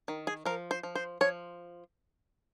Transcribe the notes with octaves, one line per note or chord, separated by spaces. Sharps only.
D#3
G#4
F3 A#4
C5
F3
C5
F3 C#5